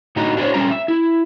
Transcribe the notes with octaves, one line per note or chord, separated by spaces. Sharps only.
A2 D3 D#4 F#4 D#5 A#5
D4 F#4 A4 A#4 C5 C#5
G3 C#4 F4 E5 G5 A#5
E5
E4